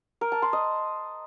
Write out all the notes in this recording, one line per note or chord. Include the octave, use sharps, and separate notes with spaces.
A#4
A5
C6
D#5